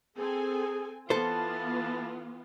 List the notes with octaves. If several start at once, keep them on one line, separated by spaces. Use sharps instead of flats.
C4 G#4 A4 G#5
E3 B3 F4 A4 C5 A5